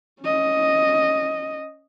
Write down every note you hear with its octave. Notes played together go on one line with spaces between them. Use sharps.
C#4 D#5